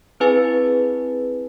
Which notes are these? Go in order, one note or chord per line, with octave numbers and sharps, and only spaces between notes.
C4 E4 G#4 B4 G#5 A6